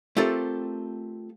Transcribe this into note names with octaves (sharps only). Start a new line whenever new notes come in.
A3 C4 F4 G4 A4 A#4